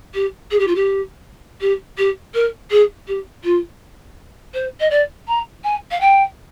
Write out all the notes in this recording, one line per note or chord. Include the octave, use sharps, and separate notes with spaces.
G4
G#4
G4
F4
G4
G4
G4
A#4
G#4
G4
F4
C5
D#5
D5
A#5
G#5
F5
G5